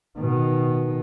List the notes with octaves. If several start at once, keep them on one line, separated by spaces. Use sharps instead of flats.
B2 D#3